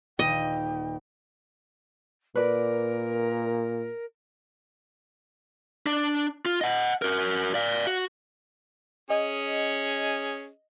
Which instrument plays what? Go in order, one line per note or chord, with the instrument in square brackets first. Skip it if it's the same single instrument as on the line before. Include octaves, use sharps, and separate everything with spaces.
[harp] D#1 [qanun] D#5 [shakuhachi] G5
[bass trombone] A#2 [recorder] A#4 [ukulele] B4 D5
[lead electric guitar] D4
F4
D#5 F#5
F#4 A#4
D5 F5
F#4
[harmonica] C#4 G#4 [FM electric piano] D#5